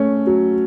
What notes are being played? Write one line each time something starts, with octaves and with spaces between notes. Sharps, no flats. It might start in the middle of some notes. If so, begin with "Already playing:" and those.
Already playing: A3 C#4
F#3